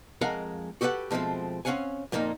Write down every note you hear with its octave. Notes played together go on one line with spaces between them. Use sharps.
F2 G#3 A#4 F5 F#5 A#5
F#4 G4 A4 B4 F#5
B2 F3 G#3 A3 C4
C4 C#4 C#5 F5 F#5 G#5
F2 A#2 A#3 D#4 G5